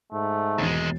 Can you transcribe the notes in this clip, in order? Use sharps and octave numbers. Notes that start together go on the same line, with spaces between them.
G#2 A3
E1 D#2 G#3 A6